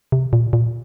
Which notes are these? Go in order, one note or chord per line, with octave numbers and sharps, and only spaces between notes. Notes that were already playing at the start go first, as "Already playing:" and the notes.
C3
A#2
A#2